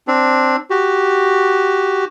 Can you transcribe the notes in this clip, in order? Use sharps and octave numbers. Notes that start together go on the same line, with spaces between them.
C4 D4
F#4 G4